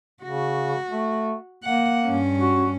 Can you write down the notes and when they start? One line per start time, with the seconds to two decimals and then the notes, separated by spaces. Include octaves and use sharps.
0.23 C#3 F#4
0.91 A3
1.64 A#3 F#5
2.06 G2 C#4
2.40 F#4